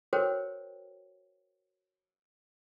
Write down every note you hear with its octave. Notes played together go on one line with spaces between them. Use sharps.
F#4 A4 A#4 C5 C#5 G5